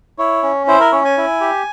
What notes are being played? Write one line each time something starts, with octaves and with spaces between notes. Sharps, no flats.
E4 C#5
C#4
E4 C5
A#4
C#4 C#5
G#5
E4
G4